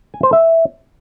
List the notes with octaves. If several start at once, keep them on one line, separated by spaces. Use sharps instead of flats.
G#5
C5
E5